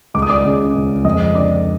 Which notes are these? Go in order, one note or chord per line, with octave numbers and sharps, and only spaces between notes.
C#2 D6
D#6
D5 D6
C#3
C#2
F2 D#5 D#6
D3 D5 D6